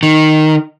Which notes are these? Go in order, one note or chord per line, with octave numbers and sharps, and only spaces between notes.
D#3